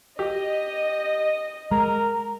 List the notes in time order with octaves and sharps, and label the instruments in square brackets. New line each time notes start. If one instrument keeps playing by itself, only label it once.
[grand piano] G4 [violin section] D#5
[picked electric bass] G#3 [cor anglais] A#4 [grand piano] A#5